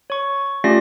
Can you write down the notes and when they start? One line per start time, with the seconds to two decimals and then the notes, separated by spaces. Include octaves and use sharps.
0.10 C#5 C#6
0.64 A3 C#4 F4 G4 D5 A#6